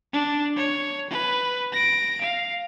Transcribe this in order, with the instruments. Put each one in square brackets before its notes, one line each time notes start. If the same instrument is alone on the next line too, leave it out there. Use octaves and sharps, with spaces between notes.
[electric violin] D4
C#5
B4
A#6 D7
F5